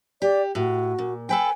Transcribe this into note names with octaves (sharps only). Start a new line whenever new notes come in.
G4 D5
A2 F#4
A#2
A4 B4 G5 G#5